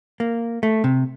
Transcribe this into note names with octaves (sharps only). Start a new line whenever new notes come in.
A#3
A3
C3